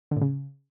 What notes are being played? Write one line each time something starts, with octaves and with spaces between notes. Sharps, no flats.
D3
A2
C#3